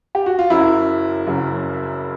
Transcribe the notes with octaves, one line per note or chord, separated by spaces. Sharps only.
G4
F#4
F4
F#1 F#2 C#3 F#3 E4
F#1 F#2 C#3 F#3